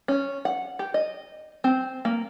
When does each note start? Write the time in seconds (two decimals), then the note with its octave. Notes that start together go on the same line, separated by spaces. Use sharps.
0.08 C#4
0.45 F#5
0.79 G4
0.94 D#5
1.64 C4
2.05 A#3